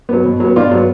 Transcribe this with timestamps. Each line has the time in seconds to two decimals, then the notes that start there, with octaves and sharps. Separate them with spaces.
0.09 F#3 B3
0.25 B2
0.40 F#3 B3
0.56 B2 D4 F4
0.72 F#3 B3